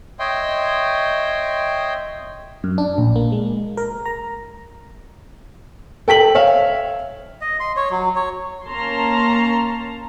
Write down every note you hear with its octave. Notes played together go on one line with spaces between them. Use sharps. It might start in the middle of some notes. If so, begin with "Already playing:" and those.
C#5 D#5 E5 G5 C6
F#2
D4
A#1
A#3
G#3
A#4
A#5
A4 G5 B6 F#7
C#5 E5 F5
D#5
C6
C#5
F#3
C#5
A#3 C#4 A5 A#5 C6